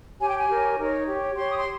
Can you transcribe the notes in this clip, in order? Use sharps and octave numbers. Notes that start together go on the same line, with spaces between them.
G4 C#5 G#5
G5
G#5
G4 A#4 C#5
D#4 A#4 C#5
G4 C#5
G4 C#5 C6
D#6
C6